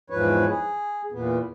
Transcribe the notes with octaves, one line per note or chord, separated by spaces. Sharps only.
E2 G#2 F3 B4 C#5
G#4
E2 A#2 B3